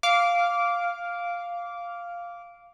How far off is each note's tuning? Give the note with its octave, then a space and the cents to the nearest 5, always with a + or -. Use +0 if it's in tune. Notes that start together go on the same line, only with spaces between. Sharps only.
F5 +0 D6 -15